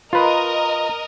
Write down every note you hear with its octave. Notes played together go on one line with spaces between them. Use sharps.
F4 A#4 B4 D#5